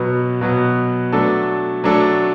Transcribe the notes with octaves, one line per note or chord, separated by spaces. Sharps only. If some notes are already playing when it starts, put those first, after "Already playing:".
Already playing: B2 F#3 B3
B2 F#3 B3
F#3 A3 D4 A4
F#3 A3 D4 A4